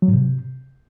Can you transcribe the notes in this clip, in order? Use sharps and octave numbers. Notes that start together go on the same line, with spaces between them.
F#3
G#2
C3